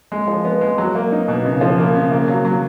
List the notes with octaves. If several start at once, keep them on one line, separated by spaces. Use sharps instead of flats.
G#3
F3
B3
G#3
F#3
A#3
D#4
B2
C#3
F3
A#3
C#3
A#3
F#3
F#3